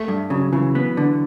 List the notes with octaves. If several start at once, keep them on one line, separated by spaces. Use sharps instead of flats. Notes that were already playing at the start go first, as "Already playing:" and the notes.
Already playing: A3
G2
C#3 F#3
C#3 E3
B3
D3